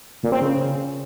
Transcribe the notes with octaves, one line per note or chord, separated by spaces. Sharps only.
A#2
C4
C#3